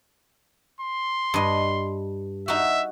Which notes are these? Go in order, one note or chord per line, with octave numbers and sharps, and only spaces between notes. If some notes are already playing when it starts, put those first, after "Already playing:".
C6
G2 D#5
D#4 F#4 E5